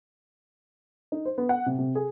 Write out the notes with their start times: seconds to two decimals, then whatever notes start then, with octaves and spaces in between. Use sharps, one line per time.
1.12 D#4
1.25 C5
1.38 B3
1.49 F#5
1.66 C3
1.79 C3
1.95 G#4